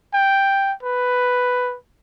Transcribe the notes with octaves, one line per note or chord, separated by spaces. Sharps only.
G5
B4